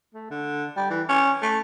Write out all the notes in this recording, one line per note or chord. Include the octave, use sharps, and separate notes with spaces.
A3
D3
G3
E3
C#4
A3